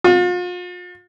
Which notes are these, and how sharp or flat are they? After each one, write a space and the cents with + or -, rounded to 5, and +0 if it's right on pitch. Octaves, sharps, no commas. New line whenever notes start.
F4 +40